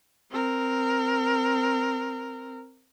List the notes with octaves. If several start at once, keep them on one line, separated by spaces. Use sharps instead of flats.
C4 A#4